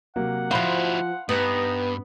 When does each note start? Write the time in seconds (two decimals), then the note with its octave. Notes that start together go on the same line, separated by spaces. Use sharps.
0.16 C3 F#3 A#3 F#5
0.51 F3 F#3 E4 C5 F5 B5 C6
1.29 G2 B3 D#4